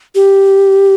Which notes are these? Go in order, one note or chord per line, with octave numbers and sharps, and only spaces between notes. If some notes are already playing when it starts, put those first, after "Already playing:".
G4